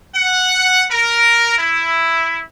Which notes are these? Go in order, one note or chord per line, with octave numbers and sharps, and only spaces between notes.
F#5
A#4
E4